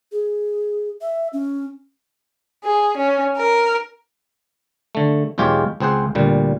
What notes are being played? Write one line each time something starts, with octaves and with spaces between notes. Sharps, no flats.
G#4
E5
C#4
G#4
C#4
A#4
D3 A3
B1 E2 G#3 F4 G4 C#5
C#2 C4 G#4 C5 F#5
D2 A#2 G3